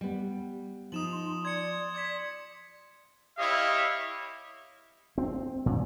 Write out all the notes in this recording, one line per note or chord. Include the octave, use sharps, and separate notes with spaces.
G3 B3
F3 D#4 D#6 E7 F#7
C6
D5 C6 G#6 C#7
D6 G#6 B6
E4 G4 C#5 D#5 F5
C4
A#2